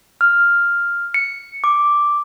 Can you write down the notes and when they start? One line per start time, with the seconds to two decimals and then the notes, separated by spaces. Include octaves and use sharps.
0.21 F6
1.14 C#7
1.64 D6